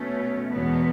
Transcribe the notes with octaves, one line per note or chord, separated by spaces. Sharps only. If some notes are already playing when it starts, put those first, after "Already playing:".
Already playing: B2 A3 C#4
E2 B2 G#3 B3